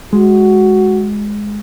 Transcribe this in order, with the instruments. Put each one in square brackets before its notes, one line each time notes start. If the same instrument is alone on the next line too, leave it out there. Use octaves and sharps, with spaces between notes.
[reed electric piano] G#3 [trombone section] F#4